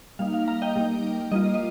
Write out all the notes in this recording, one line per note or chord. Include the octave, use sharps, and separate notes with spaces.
G3 A#3 D#4 F5
F5
F5 A#5
D#5 G5
G3 A#3 D#4
G3 A#3 F4 D#5
D#5